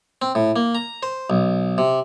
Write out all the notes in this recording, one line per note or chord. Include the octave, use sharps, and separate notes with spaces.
C4
A2
A#3
A#5
C5
B1
C3